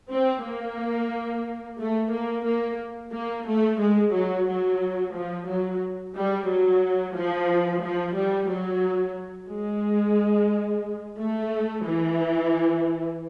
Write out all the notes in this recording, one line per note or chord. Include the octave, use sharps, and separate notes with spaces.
C4
A#3
A3
A#3
A#3
A#3
A3
G#3
F#3
F#3
F3
F#3
G3
F#3
F3
F3
G3
F#3
G#3
A3
E3